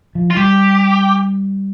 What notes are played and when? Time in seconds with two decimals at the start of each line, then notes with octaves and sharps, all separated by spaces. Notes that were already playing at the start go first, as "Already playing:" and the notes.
0.15 F3
0.31 F4
0.36 G3 G4